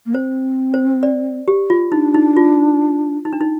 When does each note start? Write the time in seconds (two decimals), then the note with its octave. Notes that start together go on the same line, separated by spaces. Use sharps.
0.06 A#3
0.14 C4 C5
0.74 C5
1.03 D5
1.48 G4
1.70 F4
1.92 D4 D#4
2.14 D#4
2.37 F4
3.25 D#4
3.33 D4
3.41 D#4